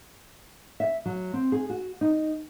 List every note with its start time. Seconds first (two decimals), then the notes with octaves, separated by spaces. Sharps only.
0.80 E5
1.06 F#3
1.33 C4
1.52 G#4
1.70 F#4
2.01 D#4